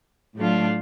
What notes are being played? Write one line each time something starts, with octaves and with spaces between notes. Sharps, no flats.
A2 F#3 A3 D4 F4